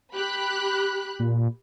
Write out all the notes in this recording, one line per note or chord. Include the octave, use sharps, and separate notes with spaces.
G4 B5 F#6
A#2